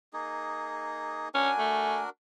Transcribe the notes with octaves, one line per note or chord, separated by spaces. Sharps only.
A#3 D#4 G#4
C#4 D4 F#4 A#4 G#5
A3